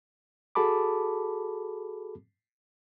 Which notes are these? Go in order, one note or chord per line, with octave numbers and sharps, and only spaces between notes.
F#4 G#4 A4 A5 B5 D6